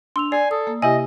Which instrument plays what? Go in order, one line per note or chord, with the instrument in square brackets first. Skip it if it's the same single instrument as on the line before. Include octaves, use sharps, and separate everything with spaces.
[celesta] D4 E6 F7 [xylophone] C6
[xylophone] D5 [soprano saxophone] G#5 [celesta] C7
[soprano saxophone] A4 [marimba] D#6
[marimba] A#3
[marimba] C3 E4 G4 [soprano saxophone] D#5 [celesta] E5 [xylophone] G#5